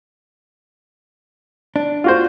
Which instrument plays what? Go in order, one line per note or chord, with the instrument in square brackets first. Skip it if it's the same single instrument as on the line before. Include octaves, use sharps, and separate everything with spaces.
[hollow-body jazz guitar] D4
[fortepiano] F4 F#4 C5